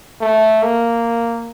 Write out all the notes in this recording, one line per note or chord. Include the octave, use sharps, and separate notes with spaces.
A3
A#3